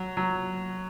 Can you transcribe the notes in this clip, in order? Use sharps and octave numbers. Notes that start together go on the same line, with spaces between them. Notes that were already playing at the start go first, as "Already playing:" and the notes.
Already playing: F#3
F#3